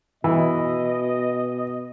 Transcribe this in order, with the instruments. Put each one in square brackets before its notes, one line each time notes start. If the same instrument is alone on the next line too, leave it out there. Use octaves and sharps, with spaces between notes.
[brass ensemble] B2 D#5 [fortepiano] E3